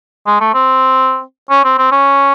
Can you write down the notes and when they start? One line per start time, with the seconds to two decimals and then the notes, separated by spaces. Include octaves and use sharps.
0.27 G#3
0.41 A3
0.54 C4
1.50 C#4
1.65 C4
1.78 C4
1.92 C#4